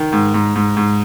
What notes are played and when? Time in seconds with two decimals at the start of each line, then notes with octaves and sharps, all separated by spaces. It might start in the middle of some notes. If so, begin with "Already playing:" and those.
Already playing: D#3
0.12 G#2
0.34 G#2
0.56 G#2
0.77 G#2